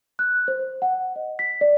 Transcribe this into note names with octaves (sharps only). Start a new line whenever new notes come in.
F#6
C5
F#5
D#5
B6
D5